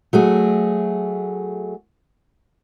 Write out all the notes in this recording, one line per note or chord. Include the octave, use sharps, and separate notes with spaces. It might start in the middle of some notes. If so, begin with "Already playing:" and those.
F#3 A3 G#4